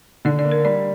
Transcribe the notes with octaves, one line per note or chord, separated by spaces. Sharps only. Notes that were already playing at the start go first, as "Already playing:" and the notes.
D3 D5
D5
A#3
A#4
G3 D5